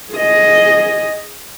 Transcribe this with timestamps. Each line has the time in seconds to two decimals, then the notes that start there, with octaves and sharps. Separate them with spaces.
0.13 G#4 D#5